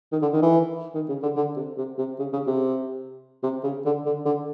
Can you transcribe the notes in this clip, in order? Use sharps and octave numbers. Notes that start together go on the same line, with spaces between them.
D#3
D3
D#3
E3
D#3
C#3
D3
D3
C3
C3
C3
C#3
C#3
C3
C3
C#3
D3
D3
D3